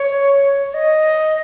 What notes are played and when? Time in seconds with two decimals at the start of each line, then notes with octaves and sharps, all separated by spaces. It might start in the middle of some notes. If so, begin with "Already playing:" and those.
Already playing: C#5
0.62 C#5
0.74 D#5